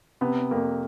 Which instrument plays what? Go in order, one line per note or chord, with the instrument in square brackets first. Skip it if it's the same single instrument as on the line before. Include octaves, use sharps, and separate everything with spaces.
[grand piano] C3 [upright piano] B3
[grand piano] F2 [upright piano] A#3